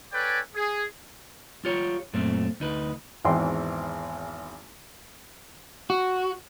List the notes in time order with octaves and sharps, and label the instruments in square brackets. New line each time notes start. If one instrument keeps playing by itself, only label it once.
[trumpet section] A4 B4 C#5 D5 G5 G#5
G#4
[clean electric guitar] F4 G4 C#5
F#2 A#2 A3 C4
D2 D#4 B4
[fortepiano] G#1 E2 E3 C4 G5 C6
[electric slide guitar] F#4